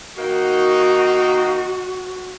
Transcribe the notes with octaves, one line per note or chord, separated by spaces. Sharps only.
D#3 A#3 D#4 F#4